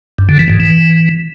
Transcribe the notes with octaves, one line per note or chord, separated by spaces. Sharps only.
G2
D3
E3
G#2
E3